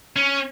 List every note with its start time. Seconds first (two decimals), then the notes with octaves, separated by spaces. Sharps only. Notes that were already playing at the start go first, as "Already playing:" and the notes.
0.16 C#4